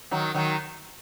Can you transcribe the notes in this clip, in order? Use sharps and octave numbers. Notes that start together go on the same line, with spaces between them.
D#3 F#3
D#3 F#3